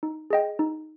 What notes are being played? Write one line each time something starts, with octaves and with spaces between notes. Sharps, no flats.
D#4
G#4 D#5 G5
D#4